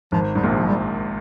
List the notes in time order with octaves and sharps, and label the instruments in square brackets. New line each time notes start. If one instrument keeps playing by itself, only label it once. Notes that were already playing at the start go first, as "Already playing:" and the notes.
[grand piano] G#1 G#2 [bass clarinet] F3
[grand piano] G#2 [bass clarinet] G3
[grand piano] A#1 A#2
[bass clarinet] F3
G3